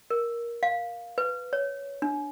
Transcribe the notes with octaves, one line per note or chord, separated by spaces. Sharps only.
A#4
F5
B4
C#5
D4